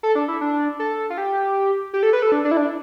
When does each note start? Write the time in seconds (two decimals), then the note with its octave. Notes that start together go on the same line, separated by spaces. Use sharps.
0.03 A4
0.15 D4
0.28 E4
0.41 D4
0.79 A4
1.10 F4
1.18 G4
1.93 G4
2.03 A4
2.13 B4
2.22 A4
2.32 D4
2.45 D4
2.51 E4
2.57 D4